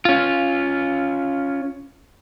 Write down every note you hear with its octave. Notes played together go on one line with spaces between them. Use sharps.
C#4 F4